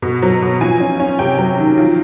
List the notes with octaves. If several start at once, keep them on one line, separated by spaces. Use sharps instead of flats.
B2
F#3
B2
F3 G#5
C#4
C#4
C3 G5
F#3
D#3
F3